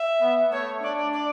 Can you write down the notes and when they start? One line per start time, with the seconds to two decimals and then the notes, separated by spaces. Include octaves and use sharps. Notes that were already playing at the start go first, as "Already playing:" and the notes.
Already playing: E5
0.21 B3
0.51 A3 C#5
0.81 D4 D5
0.97 D5
1.12 D5